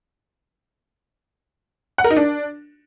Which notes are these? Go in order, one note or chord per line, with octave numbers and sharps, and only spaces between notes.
F#5
A#4
D#4
D4